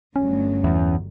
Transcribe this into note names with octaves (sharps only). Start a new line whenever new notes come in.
G1 D2 F#3 C#4
E2